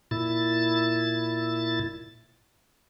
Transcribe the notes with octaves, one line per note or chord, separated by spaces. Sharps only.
A#2 E4 A6